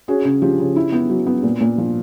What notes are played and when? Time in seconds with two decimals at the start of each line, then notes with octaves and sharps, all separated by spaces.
0.08 C#4 F#4 G#4
0.25 C#3
0.42 F3 G4
0.60 C#3
0.76 E4
0.92 B3
1.10 F#3
1.27 B3
1.43 A#2
1.61 A#2
1.78 F3